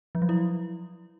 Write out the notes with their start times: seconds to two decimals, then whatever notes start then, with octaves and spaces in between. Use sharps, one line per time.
0.15 F3
0.22 F#3
0.29 E4